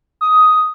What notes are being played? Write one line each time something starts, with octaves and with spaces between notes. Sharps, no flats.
D#6